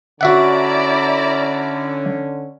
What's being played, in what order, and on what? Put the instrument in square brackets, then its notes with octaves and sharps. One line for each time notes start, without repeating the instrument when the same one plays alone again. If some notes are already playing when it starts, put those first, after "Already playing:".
[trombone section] D3 C#4 [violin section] E4 D5 A#5 [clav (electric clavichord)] F#4 E5 F#5